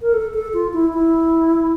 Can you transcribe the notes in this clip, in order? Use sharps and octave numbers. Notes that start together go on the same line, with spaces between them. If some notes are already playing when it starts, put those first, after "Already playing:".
A#4
A4
A4
F4
E4
E4